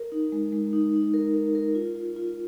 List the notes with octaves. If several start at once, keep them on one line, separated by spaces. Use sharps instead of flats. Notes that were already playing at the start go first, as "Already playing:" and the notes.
Already playing: A#4
D#4
G#3
G#3
D#4
D#4
A#4
A#4
A#4
F4
F4
F4